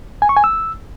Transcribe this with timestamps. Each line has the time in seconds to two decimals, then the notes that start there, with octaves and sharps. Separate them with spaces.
0.22 G#5
0.29 C#6
0.37 G#5
0.44 E6